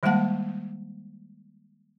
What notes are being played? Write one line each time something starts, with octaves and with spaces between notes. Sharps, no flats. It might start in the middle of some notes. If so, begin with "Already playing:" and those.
D#3 G3 G#3 A#3 F#5 A5